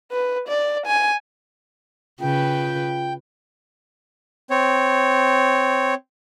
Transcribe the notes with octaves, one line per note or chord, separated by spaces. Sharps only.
B4
D5
G#5
C#3 F4 B4 G5
C4 C#5